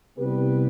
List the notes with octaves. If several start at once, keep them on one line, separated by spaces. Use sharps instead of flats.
C2 C3 G3 B3 G4 B4